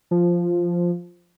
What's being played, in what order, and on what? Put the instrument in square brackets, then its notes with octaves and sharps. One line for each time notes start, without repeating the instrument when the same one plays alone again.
[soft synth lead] F3